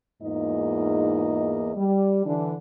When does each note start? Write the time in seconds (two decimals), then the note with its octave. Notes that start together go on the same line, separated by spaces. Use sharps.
0.22 E2 G#2 A#3 D#4 F4 D#5
1.76 G3
2.25 D3 E3 D4